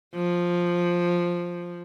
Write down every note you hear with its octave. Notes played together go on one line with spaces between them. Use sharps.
F3